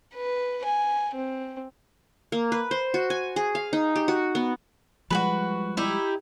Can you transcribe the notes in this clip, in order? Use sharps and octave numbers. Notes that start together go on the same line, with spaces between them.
B4
G#5
C4
A#3
B4
C5
F#4
G#5
G#4
F5
D#4
G4
F#4
B3
F3 G3 G#3 F#4 G#4 B4
D#4 E4 G4